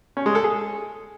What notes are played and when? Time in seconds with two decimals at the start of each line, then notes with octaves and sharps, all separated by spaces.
0.17 C#4
0.26 G#3
0.35 A4
0.44 G#4